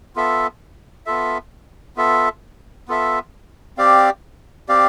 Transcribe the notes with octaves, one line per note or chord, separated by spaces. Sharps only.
B3 F4 A4 E5
B3 F4 A4 E5
B3 F4 A4 E5
B3 F4 A4 E5
C4 G4 D5 F5
C4 G4 D5 F5